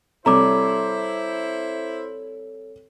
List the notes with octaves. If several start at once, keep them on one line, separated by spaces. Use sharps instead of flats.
C3 G3 E4 A4 C5 C#5 A#5 D6